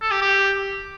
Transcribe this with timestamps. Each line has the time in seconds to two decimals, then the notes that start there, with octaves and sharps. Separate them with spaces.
0.01 A4
0.11 G4
0.22 G4